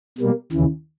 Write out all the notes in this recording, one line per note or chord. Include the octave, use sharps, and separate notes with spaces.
B2 G3 A#3
D#2 C#3 E3